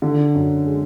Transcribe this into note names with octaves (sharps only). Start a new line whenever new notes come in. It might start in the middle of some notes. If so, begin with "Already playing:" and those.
D3
F#2
G#3